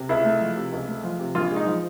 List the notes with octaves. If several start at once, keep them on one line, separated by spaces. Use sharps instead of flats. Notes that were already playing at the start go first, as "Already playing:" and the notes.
Already playing: C3
C#2 E4
A3
F3
C3
C#2
A3
F3
C3
A#1 F4
G#3
D#4
F3